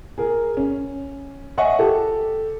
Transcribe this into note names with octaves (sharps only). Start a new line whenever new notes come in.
G#4 A#4
C#4
C#5 D#5 E5 F#5 G#5 C#6
G4 A4